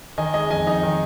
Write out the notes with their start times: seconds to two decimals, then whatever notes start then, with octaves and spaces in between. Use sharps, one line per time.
0.18 D#3 D#5 G#5
0.34 G#3 D#5 G#5
0.50 F2 D#5 G#5
0.67 D#4 D#5
0.83 D#3